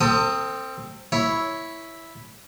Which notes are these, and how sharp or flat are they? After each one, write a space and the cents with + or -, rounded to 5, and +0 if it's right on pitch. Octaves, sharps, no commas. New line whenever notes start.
C4 +5 A4 +40 D#6 +5
E4 -5 C#5 +0